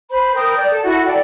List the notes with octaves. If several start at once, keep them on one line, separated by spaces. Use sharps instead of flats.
C5 B5
A#4 G5 D#6 G6
D5
A4
E4 F#4 F#5
A4 D5 G5